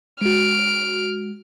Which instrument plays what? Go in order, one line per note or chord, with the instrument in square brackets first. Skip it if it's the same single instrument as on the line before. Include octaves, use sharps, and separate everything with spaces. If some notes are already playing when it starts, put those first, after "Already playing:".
[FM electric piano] G#3 F#4 [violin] F6 D7